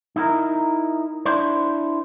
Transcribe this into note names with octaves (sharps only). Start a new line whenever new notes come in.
D#4 E4 A#4
D4 E4 C5